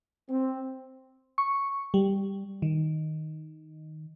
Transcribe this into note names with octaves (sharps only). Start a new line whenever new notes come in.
C4
C#6
G3
D#3